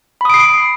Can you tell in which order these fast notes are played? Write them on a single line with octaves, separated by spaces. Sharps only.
B5 D#6 D7 C7